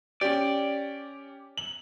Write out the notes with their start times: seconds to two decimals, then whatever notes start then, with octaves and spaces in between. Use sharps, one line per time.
0.21 C#4 G4 D5
1.57 F#7